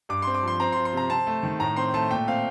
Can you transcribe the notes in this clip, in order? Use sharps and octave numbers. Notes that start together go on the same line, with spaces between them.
G2 D6
C4 C6
D6
F3 C6
C4 A#5
F3 C6
C6
C3 A#5
C4 A5
A3
D#3
A2 A#5
C4 C6
A3 A5
A#2 G5
C4 F5